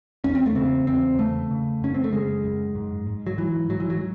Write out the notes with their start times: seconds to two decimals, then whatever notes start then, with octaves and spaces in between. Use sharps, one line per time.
0.24 E2 C#4
0.35 C4
0.46 A3
0.55 C#3 C4
0.87 E2 C4
1.18 C#3 A3
1.51 C#3
1.82 F#2 C#4
1.94 C4
2.04 A3
2.12 C#3 G#3
2.44 F#2
2.75 G#2
3.07 G#2
3.27 F#3
3.38 G#2 E3
3.70 G#2 F#3
3.80 E3
3.90 F#3